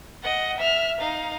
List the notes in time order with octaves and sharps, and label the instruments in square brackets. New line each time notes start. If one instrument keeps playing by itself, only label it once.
[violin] D#5 F#5
E5 F6
D#4 F5